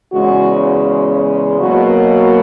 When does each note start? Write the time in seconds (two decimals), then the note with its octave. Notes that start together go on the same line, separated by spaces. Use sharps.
0.12 E2 C#3 G#3 F#4
1.59 B2 F#3 A#3 F#4